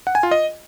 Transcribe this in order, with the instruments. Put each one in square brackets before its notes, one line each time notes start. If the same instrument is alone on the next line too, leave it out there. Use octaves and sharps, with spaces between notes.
[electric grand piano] F#5
G#5
F4
D#5